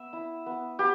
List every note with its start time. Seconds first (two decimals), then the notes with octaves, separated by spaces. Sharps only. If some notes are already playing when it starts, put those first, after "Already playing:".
Already playing: B3 E5
0.13 E4
0.46 B3
0.79 B3 G4